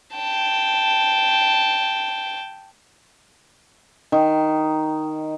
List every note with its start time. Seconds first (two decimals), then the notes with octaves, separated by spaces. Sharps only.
0.15 G5 A5
4.12 D#3